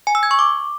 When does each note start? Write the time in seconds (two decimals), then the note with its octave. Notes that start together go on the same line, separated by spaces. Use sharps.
0.07 G#5
0.15 E6
0.23 G#6
0.31 C#6
0.39 D6